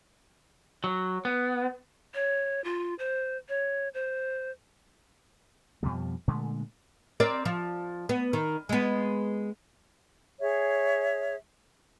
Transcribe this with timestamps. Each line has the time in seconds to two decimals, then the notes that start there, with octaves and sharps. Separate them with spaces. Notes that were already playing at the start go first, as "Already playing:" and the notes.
0.84 F#3
1.25 B3
2.14 C#5
2.64 F4
2.99 C5
3.49 C#5
3.94 C5
5.83 F2 B2 F3 G3
6.28 A#2 D3 G#3 A3
7.20 C4 A#4 D5
7.45 F3
8.09 B3
8.33 D#3
8.69 G#3 B3
10.40 G#4 C#5 E5